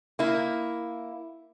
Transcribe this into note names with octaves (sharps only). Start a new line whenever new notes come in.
A#3 E4